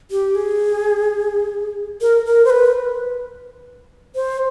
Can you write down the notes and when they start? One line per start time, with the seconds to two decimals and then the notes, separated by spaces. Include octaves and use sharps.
0.11 G4
0.35 G#4
2.01 A#4
2.26 A#4
2.45 C5
2.50 B4
4.15 C5